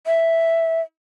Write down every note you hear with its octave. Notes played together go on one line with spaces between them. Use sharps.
E5